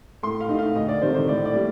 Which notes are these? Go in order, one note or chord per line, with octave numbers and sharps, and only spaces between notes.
A2 C6
F5
A3 D#4
F5
D2 D#5
D5
C3 D#3 A3 C5
C5
A2 D5
D5
G3 A#3